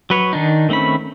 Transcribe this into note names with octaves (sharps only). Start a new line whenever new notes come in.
F#3 B4 C#5
D#3 D4 D#4
D#3 A3 C4 C#4 B5